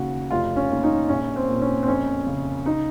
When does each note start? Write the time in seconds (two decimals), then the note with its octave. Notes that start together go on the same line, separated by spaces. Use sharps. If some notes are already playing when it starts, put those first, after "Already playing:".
Already playing: D#2 C#3 F#4
0.31 F1 F4
0.56 C#4
0.70 D#2
0.83 D#4
1.09 A#1 C#4
1.36 C4
1.48 A#2
1.62 C#4
1.83 C4
1.88 F2 C#4
2.26 C#3
2.66 D#4